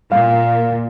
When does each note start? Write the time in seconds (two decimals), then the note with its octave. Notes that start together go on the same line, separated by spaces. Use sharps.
0.12 A#2 F5